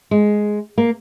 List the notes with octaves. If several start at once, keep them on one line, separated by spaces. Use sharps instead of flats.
G#3
A#3